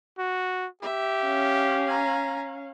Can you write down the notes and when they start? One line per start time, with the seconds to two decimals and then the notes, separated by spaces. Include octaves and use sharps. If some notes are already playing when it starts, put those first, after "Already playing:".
0.18 F#4
0.82 G4 E5
1.22 C#4 F5
1.86 G#5 A#5